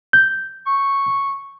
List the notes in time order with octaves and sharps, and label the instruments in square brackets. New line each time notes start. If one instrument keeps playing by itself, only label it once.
[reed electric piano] G6
[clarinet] C#6